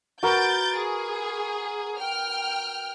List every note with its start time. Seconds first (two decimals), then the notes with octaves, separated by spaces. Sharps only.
0.23 F#4 A#4 B4 G6 A6 D7
0.76 G#4
1.99 G5 F6